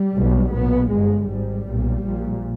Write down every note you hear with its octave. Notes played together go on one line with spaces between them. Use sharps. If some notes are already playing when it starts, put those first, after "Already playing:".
Already playing: G3
B1 B2
B1 A#2 B3
G1 G2 G#3
G#1 G#2 G3
B1 A#2
A#1 A#2